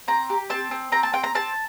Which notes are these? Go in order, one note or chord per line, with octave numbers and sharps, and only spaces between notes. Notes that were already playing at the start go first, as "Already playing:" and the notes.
C4 A#5
G4
C4 A5
C4
C4 A#5
A5
C4 G5
A#5
C4 A5